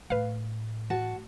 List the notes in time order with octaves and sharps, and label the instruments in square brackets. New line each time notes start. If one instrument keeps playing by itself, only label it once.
[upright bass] A2 [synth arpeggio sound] B4 F5
[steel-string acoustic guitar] F#4 F#5 A5 [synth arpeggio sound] A6